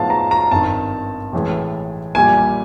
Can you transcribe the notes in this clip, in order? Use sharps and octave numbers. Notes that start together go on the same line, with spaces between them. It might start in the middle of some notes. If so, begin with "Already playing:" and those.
Already playing: A2 F3 G#3 B3 D#4 F5 A5
A#5
A#5
G#1 G2 D#3 A5
A1 A2 E3 G#3
A#1 A#2 G3 G#5